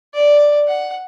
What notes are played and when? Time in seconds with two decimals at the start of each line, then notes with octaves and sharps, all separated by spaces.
0.14 D5
0.68 F#5